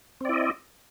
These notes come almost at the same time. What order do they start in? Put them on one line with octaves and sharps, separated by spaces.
C4 D5 E4 D#5